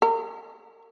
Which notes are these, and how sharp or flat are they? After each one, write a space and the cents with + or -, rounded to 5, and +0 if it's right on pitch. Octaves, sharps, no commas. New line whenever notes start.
A#4 -35